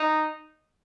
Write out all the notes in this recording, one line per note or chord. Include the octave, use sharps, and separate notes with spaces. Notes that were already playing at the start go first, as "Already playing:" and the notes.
Already playing: D#4